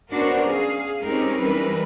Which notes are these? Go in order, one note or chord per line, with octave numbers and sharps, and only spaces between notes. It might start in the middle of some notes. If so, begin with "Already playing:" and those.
B3 C#4 D4 F#4 A#4 C5
G#4 F5
G#3 C4 C#4 D#4 G4 A#4
E3 G3 C4 A#4 B4